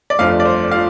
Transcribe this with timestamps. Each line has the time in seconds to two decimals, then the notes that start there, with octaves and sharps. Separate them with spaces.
0.10 D5
0.19 G1 F2 F3 A3 F5
0.40 D5
0.46 C5
0.71 F3 F5